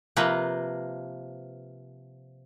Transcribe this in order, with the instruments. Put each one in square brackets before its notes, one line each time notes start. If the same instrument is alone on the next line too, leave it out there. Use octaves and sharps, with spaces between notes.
[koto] C3 F3 A#3 B4